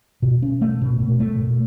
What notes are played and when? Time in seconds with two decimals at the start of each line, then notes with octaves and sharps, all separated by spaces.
0.22 B2
0.42 C#4
0.61 A3
0.82 B2
1.00 B2
1.20 A3
1.39 B2